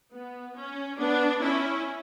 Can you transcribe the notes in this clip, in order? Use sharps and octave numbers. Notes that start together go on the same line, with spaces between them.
B3
C#4
B3 D4
C#4 E4